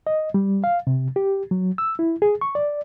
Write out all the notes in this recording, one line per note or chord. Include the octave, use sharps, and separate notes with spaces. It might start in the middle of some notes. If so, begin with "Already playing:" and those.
D#5
G3
F5
C3
G4
F#3
E6
E4
G#4
C#6
D5